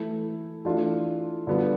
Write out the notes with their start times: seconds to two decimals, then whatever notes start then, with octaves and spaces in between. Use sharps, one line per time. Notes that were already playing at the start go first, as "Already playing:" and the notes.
Already playing: E3 A3 E4
0.65 E3 A3 D4 F4
1.47 D3 G3 B3 F4